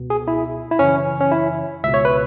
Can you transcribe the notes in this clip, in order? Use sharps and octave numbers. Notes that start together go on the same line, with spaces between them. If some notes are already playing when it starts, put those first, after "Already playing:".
Already playing: C#2 B2
G#4
E4
E4
F#2 C#3 E3 C#4
C#4
E4
C#2 B2 E5
C#5
B4